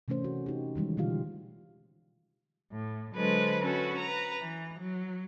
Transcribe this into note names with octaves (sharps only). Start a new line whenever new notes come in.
C3 E3 A3 C#4 C5
F#4
D#4 G4
D#3 E3 G3 G#3
B2 D3 E3 F4 G4 F5
A2
D3 F#3 G#3 A4 B4 C5
C#4 F#4 A4 B4
B4 A#5
E3
F#3